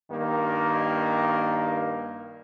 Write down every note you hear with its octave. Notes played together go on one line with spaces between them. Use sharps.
G2 D#3 A#3